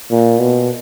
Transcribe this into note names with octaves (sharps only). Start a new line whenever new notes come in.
A#2
B2